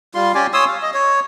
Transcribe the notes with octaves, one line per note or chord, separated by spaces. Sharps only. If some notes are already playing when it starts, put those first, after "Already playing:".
G3 F4 C6
C#4 G4 D5 G#5
C#5 C6 D#6 E6
F5
D#5
C#5